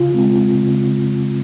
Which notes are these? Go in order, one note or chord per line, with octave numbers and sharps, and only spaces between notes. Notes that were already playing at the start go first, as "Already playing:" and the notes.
Already playing: C#3 F4
G#3 C4
C#3